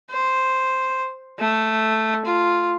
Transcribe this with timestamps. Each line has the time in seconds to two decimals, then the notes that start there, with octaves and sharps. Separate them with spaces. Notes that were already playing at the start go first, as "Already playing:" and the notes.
0.11 C5
1.39 A3
2.25 F4